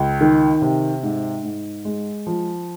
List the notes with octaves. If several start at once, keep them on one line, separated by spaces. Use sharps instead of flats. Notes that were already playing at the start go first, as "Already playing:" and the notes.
Already playing: C#2
D#3
C3
G#2
G#2
G#3
F3